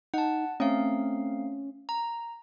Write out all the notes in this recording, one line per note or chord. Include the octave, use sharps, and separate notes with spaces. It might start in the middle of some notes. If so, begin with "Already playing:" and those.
D#4 F#5 A5
A3 C4 C#4 F5
A#5